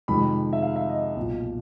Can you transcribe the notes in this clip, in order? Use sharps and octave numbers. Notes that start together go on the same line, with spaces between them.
F2 C3 D#3 G#3 B5
E5
F5
E5
D#5
B1 A#2 F3